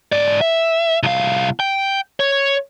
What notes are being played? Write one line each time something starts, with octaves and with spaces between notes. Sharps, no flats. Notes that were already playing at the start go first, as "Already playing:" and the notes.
G#2 D5
E5
C2 F5
G5
C#5